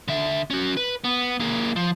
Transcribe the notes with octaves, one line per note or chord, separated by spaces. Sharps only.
D3 E5
C#4 F#4
B4
B3
A#3 G#4
F3